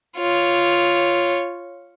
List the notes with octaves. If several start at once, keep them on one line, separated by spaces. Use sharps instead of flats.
F4 C#5